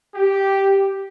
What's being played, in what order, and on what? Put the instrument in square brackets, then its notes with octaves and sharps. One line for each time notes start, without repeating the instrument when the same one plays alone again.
[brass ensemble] G4